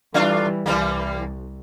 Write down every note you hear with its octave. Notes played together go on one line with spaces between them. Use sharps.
E3 G3 A3 D4 F4
C2 E3 G3 A#3